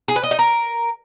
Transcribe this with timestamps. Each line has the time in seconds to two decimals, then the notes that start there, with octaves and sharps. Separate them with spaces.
0.08 G#4
0.16 B4
0.23 D#5
0.31 D#4
0.39 A#4